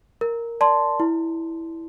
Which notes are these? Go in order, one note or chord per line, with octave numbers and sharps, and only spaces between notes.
A#4
D5 A5 C6
E4